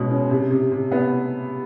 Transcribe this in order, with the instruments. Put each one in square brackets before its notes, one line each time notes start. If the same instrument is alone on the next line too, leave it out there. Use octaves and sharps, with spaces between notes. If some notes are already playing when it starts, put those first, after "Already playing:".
Already playing: [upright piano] B2 G#3 C#4
C#4
C3
C3
C3
B3